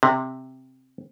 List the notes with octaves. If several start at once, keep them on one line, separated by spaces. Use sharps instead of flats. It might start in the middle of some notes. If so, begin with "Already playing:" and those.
C3